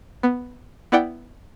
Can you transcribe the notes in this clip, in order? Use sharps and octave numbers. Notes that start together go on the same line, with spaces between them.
B3
B3 E4 D5 F#5 G5